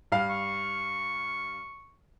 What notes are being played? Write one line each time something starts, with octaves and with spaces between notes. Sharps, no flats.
G2 F5
C#6